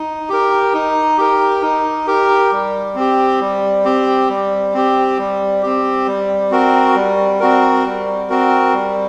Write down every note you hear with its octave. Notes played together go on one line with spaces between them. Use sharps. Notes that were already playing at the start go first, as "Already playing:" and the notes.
Already playing: D#4
G4 A#4
D#4
G4 A#4
D#4
G4 A#4
G3
C4 G4
G3
C4 G4
G3
C4 G4
G3
C4 G4
G3
C4 F#4 A#4
G3
C4 F#4 A#4
G3
C4 F#4 A#4
G3